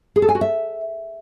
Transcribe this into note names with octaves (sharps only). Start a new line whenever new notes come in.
G#4
A4
G#5
F#4
E5